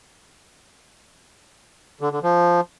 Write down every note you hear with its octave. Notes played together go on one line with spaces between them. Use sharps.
D3
D3
F3